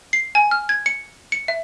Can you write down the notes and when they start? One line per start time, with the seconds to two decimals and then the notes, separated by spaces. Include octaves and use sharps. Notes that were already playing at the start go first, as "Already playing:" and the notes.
0.13 C7
0.35 G#5
0.51 F6
0.69 G#6
0.86 C#7
1.32 C#7
1.48 E5